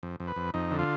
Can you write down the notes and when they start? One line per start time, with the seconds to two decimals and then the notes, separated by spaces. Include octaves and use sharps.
0.03 F2
0.20 F2
0.28 B4
0.36 F2
0.54 F2 D#4
0.71 D3
0.79 F4